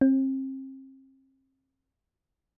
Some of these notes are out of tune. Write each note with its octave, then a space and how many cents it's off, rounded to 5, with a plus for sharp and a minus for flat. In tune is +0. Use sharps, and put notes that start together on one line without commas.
C4 +35